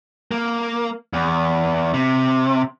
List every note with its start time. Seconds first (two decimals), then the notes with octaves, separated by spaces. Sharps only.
0.31 A#3
1.13 E2
1.94 C3